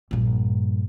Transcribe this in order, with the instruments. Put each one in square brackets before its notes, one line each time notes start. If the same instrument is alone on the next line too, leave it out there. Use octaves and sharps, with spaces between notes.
[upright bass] A#1 G2